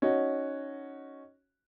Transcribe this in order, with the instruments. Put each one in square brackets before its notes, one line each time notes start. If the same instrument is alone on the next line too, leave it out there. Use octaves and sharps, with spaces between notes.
[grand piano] C#4 D#4 F#4